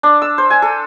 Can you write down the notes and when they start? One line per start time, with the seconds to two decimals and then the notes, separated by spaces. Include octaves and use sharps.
0.03 D4
0.22 E6
0.38 C5
0.50 G#5
0.62 A4